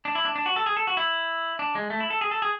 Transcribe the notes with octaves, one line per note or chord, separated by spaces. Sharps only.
D4
E4
D4
D4
F#4
A4
G#4
A4
F#4
E4
D4
G#3
A3
E4
A4
G#4
A4
G#4